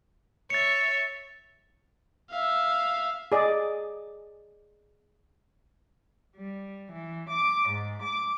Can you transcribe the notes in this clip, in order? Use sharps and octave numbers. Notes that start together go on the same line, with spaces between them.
C#5 E5 A6 C#7
E5 F5
G#4 D5 D#5
G3
E3
D6
G#2
D6